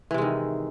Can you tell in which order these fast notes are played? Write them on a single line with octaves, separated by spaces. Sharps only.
E3 C3 G#3 D#3